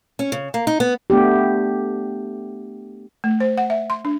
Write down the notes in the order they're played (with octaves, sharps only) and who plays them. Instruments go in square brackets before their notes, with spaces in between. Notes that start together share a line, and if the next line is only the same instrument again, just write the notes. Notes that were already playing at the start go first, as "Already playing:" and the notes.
[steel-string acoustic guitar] C#4
C#3
A#3
D#4
B3
[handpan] A3 B3 D4 G4
[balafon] A3
C5
F#5
E5
C6
D4